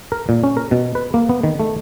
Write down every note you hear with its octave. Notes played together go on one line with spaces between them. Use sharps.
A#4
A#2
C#4
A#4
B2
B4
A#3
B3
D#3
A3